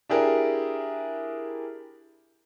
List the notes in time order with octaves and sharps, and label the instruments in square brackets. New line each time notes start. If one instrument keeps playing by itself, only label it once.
[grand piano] D4 E4 G4 G#4 A#4